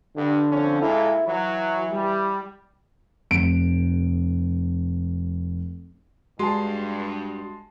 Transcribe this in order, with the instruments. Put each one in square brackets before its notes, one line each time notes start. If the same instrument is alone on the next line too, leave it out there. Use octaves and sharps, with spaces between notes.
[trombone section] G2 [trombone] D3
[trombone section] F3 C4 C#4
[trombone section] A#2 G#3 A4 [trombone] E4
[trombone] E3 [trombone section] F#3
[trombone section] G3
[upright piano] F1 D7
[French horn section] G2 [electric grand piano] G#3 [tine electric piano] F#4 [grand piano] A5 C6